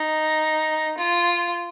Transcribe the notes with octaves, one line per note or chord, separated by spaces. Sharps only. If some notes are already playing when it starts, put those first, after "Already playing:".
Already playing: D#4
F4